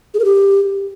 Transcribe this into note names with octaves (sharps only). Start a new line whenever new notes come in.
G#4
A#4
G4